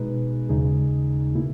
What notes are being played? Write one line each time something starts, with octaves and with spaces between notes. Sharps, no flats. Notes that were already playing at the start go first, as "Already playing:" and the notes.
Already playing: B2 G#3 D#4 G#4 B4
D#2 C#3 G#3 D#4 G#4
B2 A#3 E4